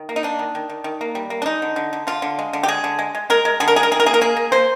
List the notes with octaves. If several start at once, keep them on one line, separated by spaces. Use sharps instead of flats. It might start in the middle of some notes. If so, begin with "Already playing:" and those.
Already playing: D#3
A#3
D#4
A#3 D4
D#3
D#3
D#3
D#3
A#3
G3
A#3
D4
G#3 D#4
D3
D3
D3
D3 F4
D3
G#3
D3
G4
G#3 G#4
D3
G#3
G#3
G#3 A#4
G#3
D3 G#4
A#4
G#3 G#4
A#4
D#3 G#4
A#4
A#3 G#4
A#4
A#3 G#4
A#3
A#3 C5